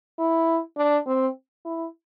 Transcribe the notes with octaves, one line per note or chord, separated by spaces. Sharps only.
E4
D4
C4
E4